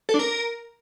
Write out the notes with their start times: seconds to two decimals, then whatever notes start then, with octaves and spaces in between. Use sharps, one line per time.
0.09 A4
0.14 D4
0.19 A#4